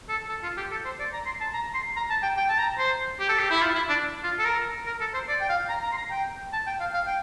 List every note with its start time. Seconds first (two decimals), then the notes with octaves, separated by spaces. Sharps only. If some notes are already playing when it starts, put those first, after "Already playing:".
0.09 A4
0.29 A4
0.43 F4
0.57 G4
0.72 A4
0.85 C5
1.00 D5
1.13 A#5
1.26 C6
1.41 A5
1.54 A#5
1.75 C6
1.96 A#5
2.10 A5
2.23 G5
2.37 G5
2.49 A5
2.59 A#5
2.79 C5
3.20 G4
3.29 A4
3.39 G4
3.51 E4
3.62 F4
3.75 E4
3.89 D4
4.24 F4
4.39 A4
4.45 A#4
4.87 A#4
5.01 A4
5.14 C5
5.28 D5
5.41 G5
5.49 F5
5.69 A#5
5.83 A#5
5.92 C6
5.98 A#5
6.11 G5
6.53 A5
6.67 G5
6.80 F5
6.94 F5
7.07 G5